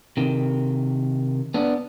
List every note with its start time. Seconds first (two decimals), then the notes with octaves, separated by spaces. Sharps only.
0.17 C3 D#3
1.54 B3 D4